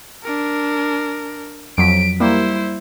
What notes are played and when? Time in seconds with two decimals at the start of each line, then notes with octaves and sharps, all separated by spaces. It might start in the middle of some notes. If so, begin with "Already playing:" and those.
0.24 D4 A#4
1.78 F2 F#3 B6 D7
2.20 G3 A#3 E4 C5